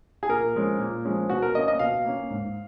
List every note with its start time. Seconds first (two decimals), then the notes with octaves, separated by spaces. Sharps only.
0.23 G#4
0.29 A#2 A#4
0.55 F3 G#3 C#4
0.79 A#2
1.05 F3 G#3 C#4
1.30 B2 F#4
1.42 A#4
1.55 A#3 C#4 D#5
1.68 D#5
1.79 B2 F5
2.05 A#3 C#4
2.30 G#2